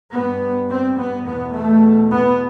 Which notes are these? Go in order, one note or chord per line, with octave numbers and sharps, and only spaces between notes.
G2 B3
C4
B3
E2 B2 B3
A3
B3